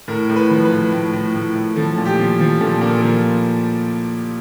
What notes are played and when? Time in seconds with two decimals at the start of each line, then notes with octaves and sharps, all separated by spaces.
0.08 A2 A#4
0.29 A2
0.36 B4
0.50 F3
0.65 B4
0.72 A2
0.92 A2
1.13 A2
1.34 A2
1.55 A2
1.76 F3 A4
1.98 A#2
2.05 G4
2.19 F3
2.40 F3
2.61 A#2 A4
2.82 A#2 A#4
3.02 F3 A#4